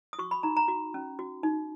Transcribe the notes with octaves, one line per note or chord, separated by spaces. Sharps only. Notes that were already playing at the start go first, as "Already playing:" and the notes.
D#6
F#4 C#6
B5
D#4 A#5
A#5
F#4
C#4
F#4
D#4